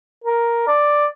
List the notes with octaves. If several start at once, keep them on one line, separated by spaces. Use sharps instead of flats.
A#4
D5